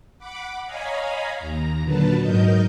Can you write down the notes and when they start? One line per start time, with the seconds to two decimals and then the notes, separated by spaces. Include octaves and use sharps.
0.18 F#5 B5 D6
0.65 C#5 D#5 F5 G#5 A#5 B5
1.38 D#2 A#5
1.83 A#2 D3 F#3 B4 A5
2.21 G#2 F#3 D#4 A#4 D#5 G6